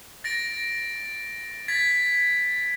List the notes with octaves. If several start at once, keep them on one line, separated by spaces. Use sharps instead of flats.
A6 A#6 D7
G#6 A6 B6